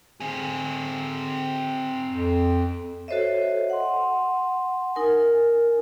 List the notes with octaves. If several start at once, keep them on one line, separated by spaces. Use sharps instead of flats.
D3 C4 G#4
F2
F#4 A4 C5 C#5 D#5 E5
F#5 C6
D#4 A#4 G#5